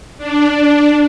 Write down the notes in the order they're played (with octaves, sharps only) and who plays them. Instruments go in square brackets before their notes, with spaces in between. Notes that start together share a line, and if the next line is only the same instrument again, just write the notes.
[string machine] D4